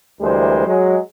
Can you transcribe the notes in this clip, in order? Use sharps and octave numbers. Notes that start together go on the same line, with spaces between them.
D2 E3 G3 G#3 A#4 C5
F#3 G#3